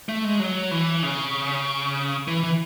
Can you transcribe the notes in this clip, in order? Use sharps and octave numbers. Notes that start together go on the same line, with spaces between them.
A3
G#3
F#3
E3
C#3
E3
E3